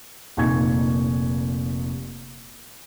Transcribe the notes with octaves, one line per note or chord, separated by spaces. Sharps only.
F1 A#2 D#4 G#5 C#6 G#6